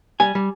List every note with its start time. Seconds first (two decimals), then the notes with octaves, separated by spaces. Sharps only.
0.20 G3 G#5
0.35 G3